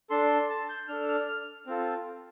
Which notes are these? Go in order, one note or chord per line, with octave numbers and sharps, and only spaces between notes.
D4 A4 C6
A5
G6
D4 A4 F6
F6
F6
C4 F4 A4